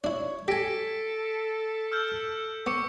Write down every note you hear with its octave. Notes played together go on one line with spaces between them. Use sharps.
D4 E4 C#5
G4 A4 G#5 A#6 B6 D7
E6 F6 G6
B3 C#6 D6 C#7